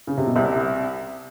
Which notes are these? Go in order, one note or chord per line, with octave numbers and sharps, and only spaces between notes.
C#3
C3
B2
C2 C3